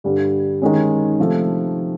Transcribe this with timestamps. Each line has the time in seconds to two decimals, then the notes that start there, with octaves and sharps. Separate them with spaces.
0.04 G2 D3 G3
0.62 D#3 G#3 C#4
1.20 C3 F3 A3